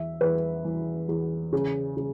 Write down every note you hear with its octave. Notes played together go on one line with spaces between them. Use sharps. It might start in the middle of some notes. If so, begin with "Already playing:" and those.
Already playing: E2 E5
E2 B4
E3
E2
C#3
C#3